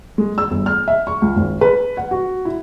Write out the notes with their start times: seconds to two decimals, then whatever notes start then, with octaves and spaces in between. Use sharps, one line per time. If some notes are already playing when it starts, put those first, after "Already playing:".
0.18 G#3
0.38 E6
0.51 G1
0.66 F6
0.88 E5
1.07 C#6
1.22 C#2
1.36 G#1
1.61 B4
1.97 F#5
2.11 F#4
2.45 E4